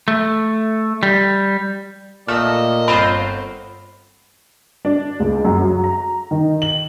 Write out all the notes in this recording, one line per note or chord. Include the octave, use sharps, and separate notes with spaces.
A3
G3
A#2 A3 D#5 E6 F6
G1 C4 F4 C5 B5
D4
C#2
F#2
F#3
A#5
D#3
F#7